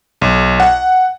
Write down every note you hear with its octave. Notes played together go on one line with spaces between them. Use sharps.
B1
F#5